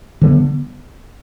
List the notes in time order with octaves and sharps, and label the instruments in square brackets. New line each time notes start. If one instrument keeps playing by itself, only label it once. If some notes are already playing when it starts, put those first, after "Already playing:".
[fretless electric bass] D3 G3 B3